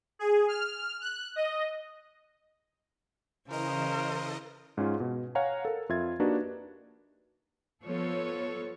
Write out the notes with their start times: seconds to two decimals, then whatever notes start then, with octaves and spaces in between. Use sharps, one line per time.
0.19 G#4
0.48 F6
1.01 F#6
1.36 D#5
3.50 C#3 E3 A#4 C5 D#5
4.77 G#2 C#4 F4
5.00 B2
5.35 C#5 F5 F#5 G#5 A#5
5.65 A4 A#4
5.89 F2 F4 E5 G#6 A6
6.20 A#3 D4 D#4 F#4 G4 B4
7.84 F3 B3 A4 C#5